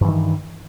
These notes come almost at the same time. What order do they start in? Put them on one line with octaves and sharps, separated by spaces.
G2 E3 D#3